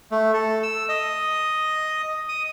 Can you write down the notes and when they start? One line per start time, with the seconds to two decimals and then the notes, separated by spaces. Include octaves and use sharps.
0.11 A3
0.34 A4
0.63 E6
0.89 D#5
2.29 D#6